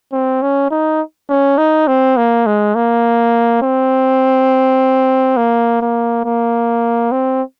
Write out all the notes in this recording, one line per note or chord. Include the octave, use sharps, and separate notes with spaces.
C4
C#4
D#4
C#4
D#4
C4
A#3
G#3
A#3
C4
A#3
A#3
A#3
C4